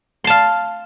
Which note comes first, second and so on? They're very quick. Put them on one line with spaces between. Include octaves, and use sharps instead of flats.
C6 A5 F5